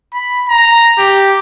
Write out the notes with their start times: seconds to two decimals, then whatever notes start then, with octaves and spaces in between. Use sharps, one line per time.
0.13 B5
0.49 A#5
0.98 G4